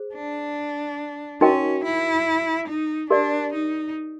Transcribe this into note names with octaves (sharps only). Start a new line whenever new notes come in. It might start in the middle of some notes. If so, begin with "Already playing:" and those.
Already playing: G#4 C5
D4
C#4 D#4 F#4 A#4 D#5 G5
E4
D#4
D4 G4 A#4 D5
D#4